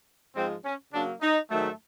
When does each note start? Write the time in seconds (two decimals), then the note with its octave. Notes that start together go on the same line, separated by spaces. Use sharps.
0.36 G#2 F3 G#3 C4
0.65 C#4
0.93 C#3 F#3 A#3 D4
1.22 D#4
1.50 G#2 D#3 F#3 A3